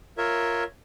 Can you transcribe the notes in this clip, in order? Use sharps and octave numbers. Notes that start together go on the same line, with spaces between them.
F4 A#4 C#5 E5